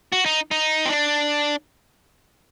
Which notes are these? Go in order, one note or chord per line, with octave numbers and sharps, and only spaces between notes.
F#4
D#4
D#4
C4
D4